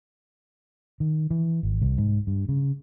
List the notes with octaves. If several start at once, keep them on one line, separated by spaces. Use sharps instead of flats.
D#3
E3
G#1
C2
G#2
G2
C#3